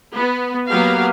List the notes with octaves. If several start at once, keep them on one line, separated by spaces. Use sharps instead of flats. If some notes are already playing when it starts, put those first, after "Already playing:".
B3
F#3 A#3 B3 G4 A#4 F5